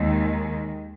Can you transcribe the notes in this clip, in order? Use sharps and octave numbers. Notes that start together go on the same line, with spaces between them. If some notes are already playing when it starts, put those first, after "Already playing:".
Already playing: D#2 D#3 G#3